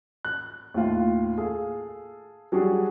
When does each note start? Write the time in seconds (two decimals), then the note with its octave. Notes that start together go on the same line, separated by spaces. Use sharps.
0.25 F#6
0.74 D#2 A2 F4 F5
1.38 G#4 A4 F5
2.52 F#3 G3 D4 F#4 G#4